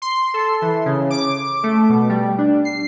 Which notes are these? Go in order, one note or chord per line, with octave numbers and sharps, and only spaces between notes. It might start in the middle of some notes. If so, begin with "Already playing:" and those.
C6
A4
E3
C#3
D6
A3
B2
G3
D4
C7